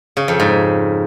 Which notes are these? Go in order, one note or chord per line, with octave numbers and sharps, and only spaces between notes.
C#3
F2
G#2